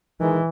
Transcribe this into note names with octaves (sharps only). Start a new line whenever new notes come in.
D#3 E3 G#3